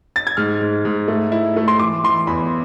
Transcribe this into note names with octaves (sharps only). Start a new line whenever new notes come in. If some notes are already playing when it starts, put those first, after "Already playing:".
A6
G#6
G#2 F6
G#2
G#2
A3
E4
A3
C6
E3 D6
E3 C6
E2 B5